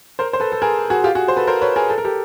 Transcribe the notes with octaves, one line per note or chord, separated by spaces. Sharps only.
A#4 C5
C5
A4 B4
A4
G#4 A#4
F#4 G#4
F4 G4
F#4 G#4
C5
A4 B4
A#4 C5
B4 C#5
G#4 A#4
A4
A#4
G4 A4